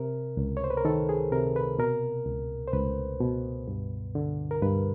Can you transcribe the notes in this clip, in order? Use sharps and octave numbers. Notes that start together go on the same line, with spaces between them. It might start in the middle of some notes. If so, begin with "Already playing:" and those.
Already playing: C3 A#4
C#2
C#5
C5
B4
A#4
D#3 A4
G#4
C3 A#4
B4
B2 A#4
C#2
C5
C#2 B4
B2
G2
D3
A#4
G2 B4